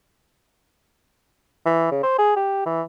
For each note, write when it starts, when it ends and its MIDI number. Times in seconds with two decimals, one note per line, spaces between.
1.66 1.91 52
1.91 2.03 49
2.03 2.15 72
2.18 2.33 68
2.37 2.64 67
2.66 2.82 52